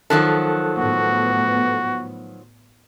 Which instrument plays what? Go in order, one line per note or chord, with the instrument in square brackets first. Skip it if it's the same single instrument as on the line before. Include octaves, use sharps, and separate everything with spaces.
[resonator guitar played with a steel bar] D#3 F3 F#3 [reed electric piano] A4 A5 F#6
[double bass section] A2 B3 [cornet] F#4